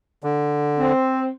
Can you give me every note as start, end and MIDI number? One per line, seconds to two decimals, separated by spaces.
0.24 0.93 50
0.79 1.28 60